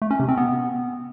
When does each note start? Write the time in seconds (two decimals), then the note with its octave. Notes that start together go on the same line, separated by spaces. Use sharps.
0.02 A3
0.11 C#4
0.20 C3
0.28 C4
0.37 B3